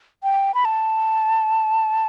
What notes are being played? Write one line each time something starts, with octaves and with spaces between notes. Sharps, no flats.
G5
B5
A5